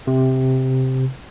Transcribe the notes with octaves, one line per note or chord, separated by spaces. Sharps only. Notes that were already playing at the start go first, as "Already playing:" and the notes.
C3